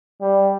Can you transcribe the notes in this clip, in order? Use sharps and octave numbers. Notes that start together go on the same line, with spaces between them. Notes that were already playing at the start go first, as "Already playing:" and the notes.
G3